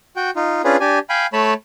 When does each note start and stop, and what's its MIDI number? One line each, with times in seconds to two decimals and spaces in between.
0.16 0.31 66
0.16 0.31 79
0.36 0.62 63
0.36 0.62 65
0.65 0.77 61
0.65 0.77 62
0.65 0.77 65
0.65 0.77 68
0.65 0.77 71
0.80 0.99 62
0.80 0.99 67
0.80 0.99 80
1.09 1.26 77
1.09 1.26 79
1.09 1.26 80
1.09 1.26 83
1.33 1.54 57
1.33 1.54 73
1.33 1.54 81
1.33 1.54 83